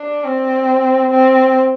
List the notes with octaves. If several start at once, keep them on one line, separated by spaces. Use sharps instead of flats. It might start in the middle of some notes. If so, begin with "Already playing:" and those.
Already playing: D4
C4
C4